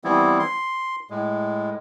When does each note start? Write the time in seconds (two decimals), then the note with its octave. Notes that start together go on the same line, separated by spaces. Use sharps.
0.04 E3 G3 B3 C4 E4
0.39 C6
1.10 A2 G#3